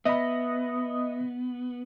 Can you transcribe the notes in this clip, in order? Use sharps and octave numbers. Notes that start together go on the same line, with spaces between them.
B3 D#5 E5 B5